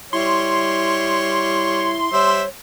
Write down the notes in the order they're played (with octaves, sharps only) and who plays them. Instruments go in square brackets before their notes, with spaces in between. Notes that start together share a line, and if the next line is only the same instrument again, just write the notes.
[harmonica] G3 C#5 [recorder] E4 [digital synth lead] C6
[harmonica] G3 C5 E5 [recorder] C#5